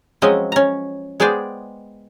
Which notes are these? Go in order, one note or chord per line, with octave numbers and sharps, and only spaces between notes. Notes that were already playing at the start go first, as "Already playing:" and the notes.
F3 F#3 G#3 C4 C#4 D#5
C#4 A#5
G#3 B3 G#4 C5 D5 G5